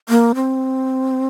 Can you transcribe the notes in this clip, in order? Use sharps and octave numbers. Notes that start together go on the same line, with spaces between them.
A#3
C4